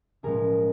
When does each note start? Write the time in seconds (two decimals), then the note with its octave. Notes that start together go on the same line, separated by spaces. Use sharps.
0.23 B1 A2 F3 G#3 C#4 G#4 A#4